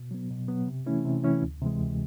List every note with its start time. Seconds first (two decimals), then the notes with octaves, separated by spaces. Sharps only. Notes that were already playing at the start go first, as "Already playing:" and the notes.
Already playing: B2
0.11 F#3 B3
0.30 B2
0.48 F#3 B3
0.68 C3
0.86 E3 A3 C#4 E4
1.05 C3
1.24 E3 A3 C#4 E4
1.42 D2
1.61 C3 E3 G#3
1.80 D2